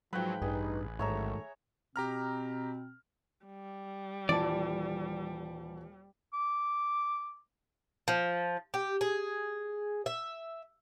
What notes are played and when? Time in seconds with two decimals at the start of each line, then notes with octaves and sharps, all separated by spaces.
0.13 G#2 F3 F#3 B4 G5
0.42 A1 G2 D#4 G#4 B4
0.99 G#2 D#3 F#3 A3 C#5 E5 A#5
1.96 B2 C4 G4 A#5 F6
3.46 G3
4.29 D#1 E3 D5 A5
6.33 D6
8.08 F3
8.74 G4
9.01 G#4
10.06 E5